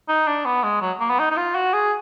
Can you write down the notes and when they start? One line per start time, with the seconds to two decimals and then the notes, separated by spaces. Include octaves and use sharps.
0.09 D#4
0.27 D4
0.45 B3
0.63 G#3
0.82 F#3
1.00 A#3
1.10 B3
1.19 D#4
1.31 D#4
1.37 F4
1.55 F#4
1.74 G#4